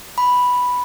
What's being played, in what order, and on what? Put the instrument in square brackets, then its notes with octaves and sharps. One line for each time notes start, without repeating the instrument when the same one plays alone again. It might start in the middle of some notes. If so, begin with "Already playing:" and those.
[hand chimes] B5